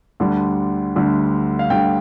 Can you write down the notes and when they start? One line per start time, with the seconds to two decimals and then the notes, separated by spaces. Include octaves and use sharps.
0.20 D2 D3 G3
0.96 D2 D3 G3
1.59 F5
1.70 D2 D3 G3 G5